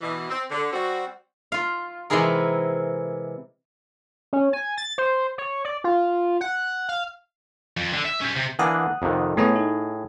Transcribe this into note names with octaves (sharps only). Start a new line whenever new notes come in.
B2 E3
C4
D3
G3 C4 F#4
F4 F5
C3 E3 G#3 E4 G#4 A#4
C#4
G#5
A6
C5
C#5
D5
F4
F#5
F5
F2
D3
E5
C#4 G4
C3
E3 A#3 D4 F#5 D#6 F#6
F2 C3 D#3
A2 A3 B3 G#4 C#5 A#5
D#4